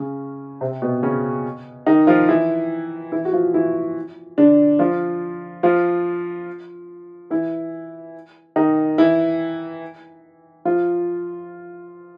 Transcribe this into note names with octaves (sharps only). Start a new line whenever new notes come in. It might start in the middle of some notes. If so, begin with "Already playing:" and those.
Already playing: C#3 C#4
C3 C4
B2 B3
C#3 C#4
D#3 D#4
F3 F4
E3 E4
E3 E4
F#4
F3 F4
E3 E4
D3 D4
F3 F4
F3 F4
E3 E4
D#3 D#4
E3 E4
F3 F4